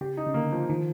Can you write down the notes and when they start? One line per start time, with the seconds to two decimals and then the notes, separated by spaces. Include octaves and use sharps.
0.01 C#3 G4
0.17 D#4
0.27 C#3
0.34 D3 A#3
0.52 F3
0.70 D#3 F3